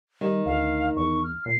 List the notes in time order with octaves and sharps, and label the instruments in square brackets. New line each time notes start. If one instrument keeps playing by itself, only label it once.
[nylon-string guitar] D#3 [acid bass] G3
[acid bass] D2 [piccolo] F5
[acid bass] E2 [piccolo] C#6
[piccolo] F6
[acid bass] A#2 [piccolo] C7